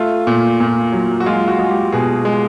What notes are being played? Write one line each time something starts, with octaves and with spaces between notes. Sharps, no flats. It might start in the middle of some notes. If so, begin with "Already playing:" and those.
Already playing: A3 F4
A#2
A#2
F#3
F#4
G#3 F4
F#4
G#3
G4
B2 G#4
G#3